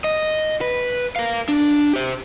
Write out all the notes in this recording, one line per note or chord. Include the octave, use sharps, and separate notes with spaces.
D#5
B4
A#4 F5
D4
G4 C5